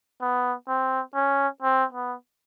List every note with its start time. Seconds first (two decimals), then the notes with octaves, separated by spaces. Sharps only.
0.21 B3
0.68 C4
1.14 C#4
1.62 C4
1.93 B3